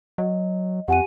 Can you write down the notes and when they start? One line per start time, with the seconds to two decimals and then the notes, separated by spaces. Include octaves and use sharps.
0.18 F#3 D#5
0.88 F2 G4 F#5 G#5 D#7